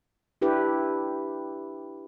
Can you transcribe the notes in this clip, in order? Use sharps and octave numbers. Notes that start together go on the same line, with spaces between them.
D4 E4 G4 B4